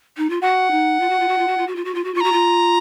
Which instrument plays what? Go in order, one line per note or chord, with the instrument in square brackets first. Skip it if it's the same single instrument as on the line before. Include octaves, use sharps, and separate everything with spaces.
[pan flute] D#4
F4
[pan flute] F#4 [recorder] F#5
[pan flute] D#4
F4
F#4
F4
F#4
F4
F#4
F4
F#4
F4
F#4
F4
F#4
[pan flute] F4 [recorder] C#6
[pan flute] F#4 [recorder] A#5
[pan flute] F4